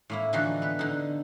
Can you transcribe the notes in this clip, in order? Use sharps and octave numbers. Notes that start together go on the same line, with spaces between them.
A2 A#3 E4
D3 E3 F3 D#4 F#4 A4
B3 B4
D3 D#4